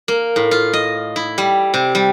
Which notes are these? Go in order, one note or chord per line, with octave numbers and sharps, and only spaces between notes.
A#3
A2
F4
D#5
E4
G3
C3
G3